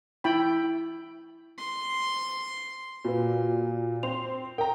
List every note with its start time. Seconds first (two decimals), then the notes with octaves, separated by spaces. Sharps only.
0.24 E4 G5 B5
1.58 C6
3.05 A#2 F#4 B4
4.03 C4 C6 F7
4.58 A#4 G5 A#5